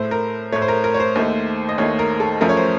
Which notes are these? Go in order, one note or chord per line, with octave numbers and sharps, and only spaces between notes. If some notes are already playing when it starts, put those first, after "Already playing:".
Already playing: A2 A3 C5
A#4
A2 A3 C#5
C5
A#4
A#4
C#5
C5
D#2 D#3 A3
D#5
D#2 D#3 A3 C#5
A#4
A4
F#2 F3 A3 A#4
C#5
C5